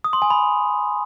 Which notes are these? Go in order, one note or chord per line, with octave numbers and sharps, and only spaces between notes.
D#6
C6
G#5
B5